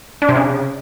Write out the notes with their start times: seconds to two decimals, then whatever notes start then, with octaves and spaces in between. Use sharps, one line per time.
0.22 D4
0.29 C3
0.35 C#3